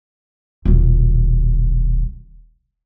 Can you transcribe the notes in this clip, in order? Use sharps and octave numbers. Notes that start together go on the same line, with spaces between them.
D#1 B1